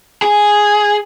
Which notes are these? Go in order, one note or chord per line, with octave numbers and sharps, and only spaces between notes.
G#4